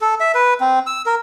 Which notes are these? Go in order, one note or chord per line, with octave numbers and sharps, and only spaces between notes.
A4
E5
B4
C4
E6
A#4